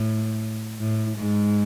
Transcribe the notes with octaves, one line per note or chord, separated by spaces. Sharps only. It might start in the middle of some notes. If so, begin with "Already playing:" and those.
Already playing: A2
A2
G#2